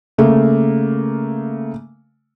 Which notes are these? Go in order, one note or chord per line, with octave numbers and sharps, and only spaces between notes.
C#3 A3 A#3